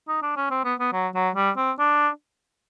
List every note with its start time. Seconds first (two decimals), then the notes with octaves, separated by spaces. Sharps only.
0.08 D#4
0.23 D4
0.36 C#4
0.51 C4
0.64 B3
0.79 B3
0.93 F#3
1.15 F#3
1.36 G3
1.57 C4
1.79 D4